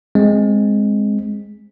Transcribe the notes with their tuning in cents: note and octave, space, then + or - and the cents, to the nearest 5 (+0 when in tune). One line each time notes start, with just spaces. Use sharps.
G#3 +0 C4 +10